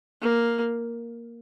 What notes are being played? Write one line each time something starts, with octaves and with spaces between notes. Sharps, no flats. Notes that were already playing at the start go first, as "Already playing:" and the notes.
A#3